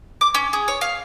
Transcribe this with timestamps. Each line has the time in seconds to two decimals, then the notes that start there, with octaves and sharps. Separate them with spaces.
0.21 D6
0.35 C#4
0.53 G#4
0.68 C#5
0.81 F5